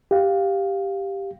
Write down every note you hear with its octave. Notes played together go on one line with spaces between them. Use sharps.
G4 F5